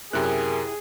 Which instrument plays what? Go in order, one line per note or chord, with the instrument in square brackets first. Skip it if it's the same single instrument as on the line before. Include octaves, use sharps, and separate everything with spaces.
[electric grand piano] F#2 C3 F#6 [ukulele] E4 G4 [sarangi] G#4 [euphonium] A#4